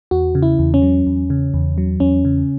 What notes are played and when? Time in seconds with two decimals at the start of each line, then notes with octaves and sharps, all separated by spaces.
0.11 E2 F#4
0.35 C#3
0.43 E4
0.59 E2
0.74 C#4
0.82 F#3
1.07 E2
1.30 C#3
1.54 E2
1.78 F#3
2.00 E2 C#4
2.25 C#3